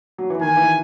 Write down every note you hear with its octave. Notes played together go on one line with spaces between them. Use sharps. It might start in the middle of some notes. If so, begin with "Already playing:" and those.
F#3
E3
D#3 G#5
E3